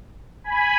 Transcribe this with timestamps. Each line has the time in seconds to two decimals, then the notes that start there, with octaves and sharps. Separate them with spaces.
0.44 G#5 B5